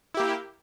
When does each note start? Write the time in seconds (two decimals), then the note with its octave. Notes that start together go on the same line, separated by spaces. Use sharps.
0.14 E4
0.17 G4
0.20 A#3